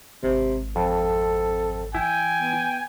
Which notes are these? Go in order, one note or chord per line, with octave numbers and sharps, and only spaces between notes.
G#1 C3
F2 A4
E3 E4 G5 G#5
B3